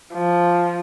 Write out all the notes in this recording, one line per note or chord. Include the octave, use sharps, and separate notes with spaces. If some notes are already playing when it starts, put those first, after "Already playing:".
F3